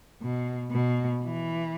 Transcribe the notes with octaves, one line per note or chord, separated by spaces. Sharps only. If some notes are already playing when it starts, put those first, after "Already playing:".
B2
B2
E3